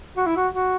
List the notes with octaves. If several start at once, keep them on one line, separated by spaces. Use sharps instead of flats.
F#4
E4
F#4
F#4